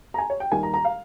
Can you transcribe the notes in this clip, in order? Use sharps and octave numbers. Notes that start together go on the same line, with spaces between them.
A#5
G#5
C#5
G5
D#2 D#3 G3 A#3 G#5
A#5
A#5
F5